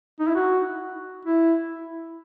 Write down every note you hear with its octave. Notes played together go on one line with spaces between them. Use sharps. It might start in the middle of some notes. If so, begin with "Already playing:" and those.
D#4
E4
F#4
E4